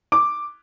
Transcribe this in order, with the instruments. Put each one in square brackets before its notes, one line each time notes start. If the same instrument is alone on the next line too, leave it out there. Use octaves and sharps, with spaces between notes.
[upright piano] D6